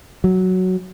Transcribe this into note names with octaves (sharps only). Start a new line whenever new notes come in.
F#3